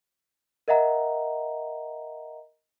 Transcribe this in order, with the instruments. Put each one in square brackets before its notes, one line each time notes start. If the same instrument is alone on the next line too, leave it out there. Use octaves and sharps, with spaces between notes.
[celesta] A#4 D#5 E5 F#5 A#5